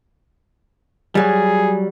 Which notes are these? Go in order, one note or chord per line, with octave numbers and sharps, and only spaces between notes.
F#3 G3 G#4